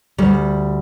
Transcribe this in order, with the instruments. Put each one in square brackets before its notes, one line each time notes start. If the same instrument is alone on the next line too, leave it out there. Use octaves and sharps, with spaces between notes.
[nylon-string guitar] D2 G3